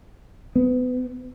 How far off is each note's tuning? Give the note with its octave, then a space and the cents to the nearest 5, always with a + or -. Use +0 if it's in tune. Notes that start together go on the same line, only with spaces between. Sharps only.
B3 +30